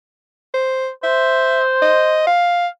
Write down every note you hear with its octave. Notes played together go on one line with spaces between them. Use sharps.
C5
C5 E5
D#5
F5